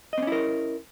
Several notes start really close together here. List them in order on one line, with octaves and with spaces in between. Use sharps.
D#5 C4 C#4 E4 A#4